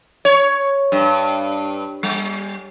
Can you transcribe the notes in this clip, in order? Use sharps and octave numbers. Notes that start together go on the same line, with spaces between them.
C#5
G2
G3